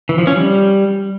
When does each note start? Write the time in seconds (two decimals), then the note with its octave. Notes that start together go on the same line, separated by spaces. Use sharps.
0.09 E3
0.18 F3
0.27 C#4
0.36 G3